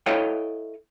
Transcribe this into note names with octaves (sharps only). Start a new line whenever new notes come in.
E4 A4 C#5 D#5 F5 G5